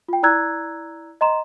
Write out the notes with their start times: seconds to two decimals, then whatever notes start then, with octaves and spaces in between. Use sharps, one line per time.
0.08 F4 G5
0.23 E4 D5 A#5 E6 F#6 G#6
1.21 D#5 A#5 C6 E7